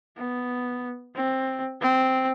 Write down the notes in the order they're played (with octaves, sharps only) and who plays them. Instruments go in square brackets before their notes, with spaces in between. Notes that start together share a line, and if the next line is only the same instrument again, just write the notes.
[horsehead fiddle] B3
C4
C4